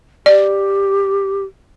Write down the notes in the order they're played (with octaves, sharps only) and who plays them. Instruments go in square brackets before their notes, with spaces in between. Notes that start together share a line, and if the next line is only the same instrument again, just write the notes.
[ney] G4 [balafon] D5